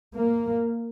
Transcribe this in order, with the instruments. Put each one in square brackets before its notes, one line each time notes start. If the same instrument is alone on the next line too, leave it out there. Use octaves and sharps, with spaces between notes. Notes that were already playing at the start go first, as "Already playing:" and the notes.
[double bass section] A#3